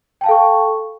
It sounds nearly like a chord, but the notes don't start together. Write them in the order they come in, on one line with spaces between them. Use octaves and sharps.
G5 A5 F5 A4 C#6